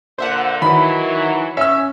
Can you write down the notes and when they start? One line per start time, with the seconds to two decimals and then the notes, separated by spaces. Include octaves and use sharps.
0.18 A#2 D3 C5 E5 F#5
0.62 D#3 E3 F#3 B5
1.57 C#4 E5 E6